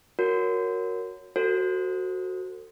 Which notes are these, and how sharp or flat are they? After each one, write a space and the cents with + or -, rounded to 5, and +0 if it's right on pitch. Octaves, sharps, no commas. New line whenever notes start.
F#4 -10 A#4 +0 C#5 +0
F#4 +0 A4 +35 C5 +0